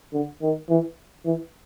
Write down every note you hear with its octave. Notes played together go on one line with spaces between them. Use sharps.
D3
D#3
E3
E3